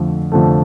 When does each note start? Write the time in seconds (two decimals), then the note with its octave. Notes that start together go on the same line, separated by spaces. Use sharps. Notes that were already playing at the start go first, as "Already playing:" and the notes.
Already playing: F2 D3 F3 A3
0.32 F2 D3 F3 A3